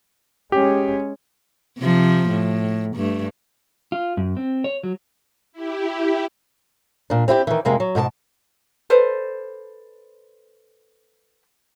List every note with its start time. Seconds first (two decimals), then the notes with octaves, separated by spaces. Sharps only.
0.52 G#3 C#4 G4
1.79 C3 F3
2.29 A2
2.96 G2 A3
3.92 F4
4.17 F#2
4.37 C4
4.64 C#5
4.83 F#3
5.52 E4 G4
7.10 A#2 D4
7.28 C4 E4 F4 G4
7.47 D#3 E3
7.65 F2 C3 G#3 A#3
7.80 F#3
7.95 G#2 B2 G#4 A5
8.90 A4 B4 C5 D5